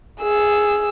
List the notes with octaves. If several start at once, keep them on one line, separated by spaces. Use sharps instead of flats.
G#4 E6